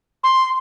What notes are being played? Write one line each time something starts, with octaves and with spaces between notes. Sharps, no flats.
C6